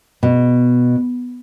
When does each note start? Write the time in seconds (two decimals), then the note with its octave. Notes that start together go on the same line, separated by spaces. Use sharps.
0.23 B2